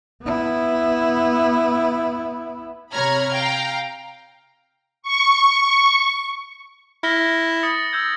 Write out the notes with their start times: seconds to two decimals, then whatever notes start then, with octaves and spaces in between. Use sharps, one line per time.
0.22 B3 E4
2.93 C3 C#5 A#5 B5 F6 G#6
3.35 F5 G5 A#5
5.03 C#6
7.03 E4 F6 A#6 G7
7.63 D#6 A6 C#7
7.93 E6 G6 G#6